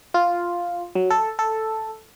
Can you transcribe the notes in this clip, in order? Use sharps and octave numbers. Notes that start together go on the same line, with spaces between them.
F4
F#3
A4
A4